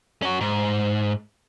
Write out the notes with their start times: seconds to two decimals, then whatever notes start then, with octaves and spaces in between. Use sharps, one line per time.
0.22 C#4 F#4
0.41 G#2